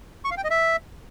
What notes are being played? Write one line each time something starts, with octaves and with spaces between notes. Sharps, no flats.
C#6
F5
G5
D#5
E5